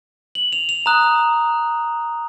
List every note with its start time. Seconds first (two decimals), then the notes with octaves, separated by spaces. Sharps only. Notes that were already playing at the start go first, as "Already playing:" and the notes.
0.35 F#7
0.53 F7
0.69 F7
0.86 A#5 D#6 F#6